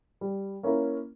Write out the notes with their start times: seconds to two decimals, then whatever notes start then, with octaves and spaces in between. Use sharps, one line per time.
0.21 G3
0.63 A#3 C#4 E4 A#4